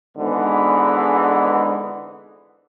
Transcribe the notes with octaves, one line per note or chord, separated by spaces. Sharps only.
G#1 G#2 D3 E3 G#3 B3